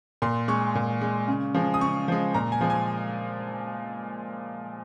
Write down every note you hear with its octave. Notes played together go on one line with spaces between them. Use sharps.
A#2 C6
G#3 C#6
A#2
G#3
C#3
F3 G#3
D#6
C#3 C#6
F3 G#3
A#2 A#5
G#5
F3 G#3
G#5